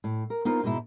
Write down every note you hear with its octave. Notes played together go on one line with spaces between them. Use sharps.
A2
A#4
B3 D#4 F4 A#4 C5
G#2 B2 G#3 D#4 E4